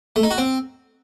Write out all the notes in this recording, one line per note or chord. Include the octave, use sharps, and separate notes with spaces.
A3
D#4
F#4
C4